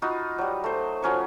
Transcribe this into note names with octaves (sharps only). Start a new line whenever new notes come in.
D#4 F4 F#4 B5
F#3 G3
A3 C5
F3 F#3 C#4 C#6